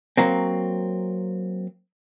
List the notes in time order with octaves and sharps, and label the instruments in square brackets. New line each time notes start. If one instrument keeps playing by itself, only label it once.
[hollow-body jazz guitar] F#3 A#3 C4